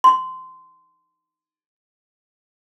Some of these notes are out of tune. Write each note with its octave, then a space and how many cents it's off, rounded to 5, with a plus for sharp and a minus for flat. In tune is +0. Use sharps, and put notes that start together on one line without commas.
C6 -20